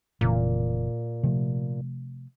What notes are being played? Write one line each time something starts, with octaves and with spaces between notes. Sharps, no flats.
F1 A#2 C#3 E3
C3 F3 A3